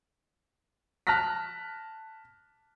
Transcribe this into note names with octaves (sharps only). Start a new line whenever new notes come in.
A5 F6 F#6 A#6 B6